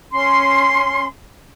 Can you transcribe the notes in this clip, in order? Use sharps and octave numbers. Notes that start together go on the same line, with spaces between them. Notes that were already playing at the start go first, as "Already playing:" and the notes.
C#4 C6